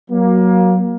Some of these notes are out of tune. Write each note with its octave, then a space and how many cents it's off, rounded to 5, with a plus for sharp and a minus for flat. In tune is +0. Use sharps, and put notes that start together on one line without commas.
F#3 +0 A#3 +20